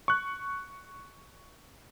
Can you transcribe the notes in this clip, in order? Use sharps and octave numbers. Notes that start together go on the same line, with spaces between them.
C#6 F#6